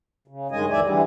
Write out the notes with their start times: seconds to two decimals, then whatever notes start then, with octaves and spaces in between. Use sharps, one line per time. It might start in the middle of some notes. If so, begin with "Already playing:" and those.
0.28 C#3
0.51 G2 D#3 G#3 D#5 G#5
0.70 D2 E3 D5 E5 G#5
0.84 D3 E3 G3